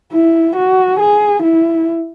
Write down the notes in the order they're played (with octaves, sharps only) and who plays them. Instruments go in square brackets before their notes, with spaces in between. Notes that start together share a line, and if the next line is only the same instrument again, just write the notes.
[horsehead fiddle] E4
F#4
G#4
E4